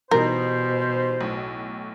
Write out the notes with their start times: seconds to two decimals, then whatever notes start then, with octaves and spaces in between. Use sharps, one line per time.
0.11 B2 E3 G3 D#4 A#4 C5
1.21 B1 A2